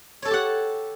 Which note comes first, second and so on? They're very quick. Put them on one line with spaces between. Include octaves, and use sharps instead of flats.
C#5 A4 A5 G4 F#5